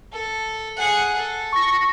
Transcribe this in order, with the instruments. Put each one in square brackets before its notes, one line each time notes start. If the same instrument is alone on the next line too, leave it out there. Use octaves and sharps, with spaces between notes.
[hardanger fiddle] A4
G#4 F#5
A4
[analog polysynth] C#6 A#6